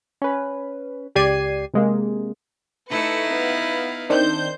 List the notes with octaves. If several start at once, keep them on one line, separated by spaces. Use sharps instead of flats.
C#4 B4
C#2 G4 D5 G#6 C7 D#7
C3 G#3 A#3
A3 D#4 E4 B4 C#7
B3 F5
D#3 C4 D4 C5 G6